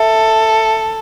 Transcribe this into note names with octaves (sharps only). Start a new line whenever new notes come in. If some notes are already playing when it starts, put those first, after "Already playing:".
Already playing: A4 E5